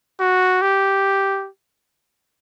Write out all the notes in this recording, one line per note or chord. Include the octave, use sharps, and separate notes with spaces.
F#4
G4